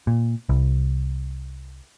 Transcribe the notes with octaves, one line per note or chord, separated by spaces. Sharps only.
A#2
C2